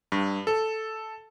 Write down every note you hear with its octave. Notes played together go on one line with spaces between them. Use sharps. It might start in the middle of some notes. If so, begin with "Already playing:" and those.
G2
A4